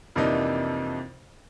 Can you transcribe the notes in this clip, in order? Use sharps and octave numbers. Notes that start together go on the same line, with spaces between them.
F2 C3 E3 A#3 D4 D#4